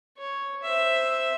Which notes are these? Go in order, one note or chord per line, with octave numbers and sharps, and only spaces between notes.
C#5
C5 E5